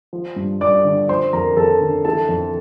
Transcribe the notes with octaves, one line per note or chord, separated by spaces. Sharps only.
F3
G2
G2 D5 D6
D3
F3 C5 C6
F2 A#4 A#5
F2 A4 A5
D3
E3 A4 A5
F2